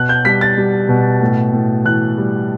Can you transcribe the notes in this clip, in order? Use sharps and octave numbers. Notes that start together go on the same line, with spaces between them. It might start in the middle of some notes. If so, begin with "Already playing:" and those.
Already playing: B2 F#6
G6
G3 B6
A6
G3
B2
A2
A2
E3 F#6
G3